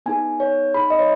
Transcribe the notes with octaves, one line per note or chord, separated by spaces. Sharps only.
B3 D#4 G#4 G#5
C#5
D#4 G#4 B5
D#5
C#5